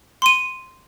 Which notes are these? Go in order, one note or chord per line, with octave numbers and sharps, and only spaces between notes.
C6 D#7